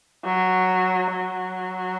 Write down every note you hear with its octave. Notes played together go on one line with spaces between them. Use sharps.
F#3
F#3